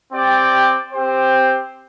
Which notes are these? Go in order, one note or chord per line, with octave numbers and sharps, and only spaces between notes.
C4 G4 D5 G5
C4 G4 C5